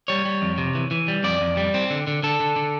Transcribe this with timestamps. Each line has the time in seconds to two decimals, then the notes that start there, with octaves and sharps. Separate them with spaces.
0.08 G3 C#5
0.25 G3
0.42 F2
0.58 C3
0.75 E3
0.91 E3
1.08 G3
1.24 F2 D5
1.41 F2
1.57 G3
1.74 C4
1.90 D3
2.07 D3
2.23 D3 A4
2.40 D3
2.56 D3